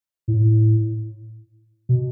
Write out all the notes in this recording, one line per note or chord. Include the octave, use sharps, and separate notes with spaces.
A2
B2